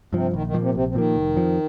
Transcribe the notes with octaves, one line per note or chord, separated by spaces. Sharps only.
G2 C3 F3
A#1 D#3
D#3
A#2 F3 A#3
C3
A#1 C3
C3
A#2 D#3 F3 A#3
F1
F2 F3